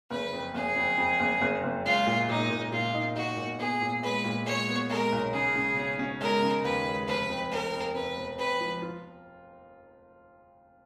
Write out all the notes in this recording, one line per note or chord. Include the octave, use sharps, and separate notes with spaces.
F#1 B4
F2
F#1 G#4
F2
F2
F#1
F#1
F#1
G#3 F4
A#2
A#2 D#4
A#2
A#2 F4
D#4
D#4 F#4
A#2
B3 G#4
A#2
G#3 B4
A#2
G#3 C#5
B3
G#3 A#4
B1
C#3 G#4
C#3
C#4
C#4
G#3 A#4
C#3
D#2 B4
G#3
F1 B4
F2
F1 A#4
F2
F2 B4
F1
F2 B4
F3
F4